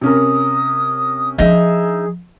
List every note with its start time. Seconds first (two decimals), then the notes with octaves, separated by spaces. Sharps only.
0.01 C3 C#4 A#4 D#6
1.38 F3 D4 D#4 G#4 E5